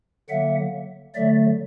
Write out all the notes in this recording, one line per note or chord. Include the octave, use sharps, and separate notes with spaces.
D3 F#3 A#3 E5 F#5
D3 F#3 A3 D5 E5